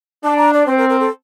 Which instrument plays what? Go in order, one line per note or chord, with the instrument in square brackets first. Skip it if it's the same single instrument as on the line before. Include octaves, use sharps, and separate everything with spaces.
[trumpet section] D4 [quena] A5
[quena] A#5
D5
[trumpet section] C4 [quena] C5
[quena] A#4
A#4
A4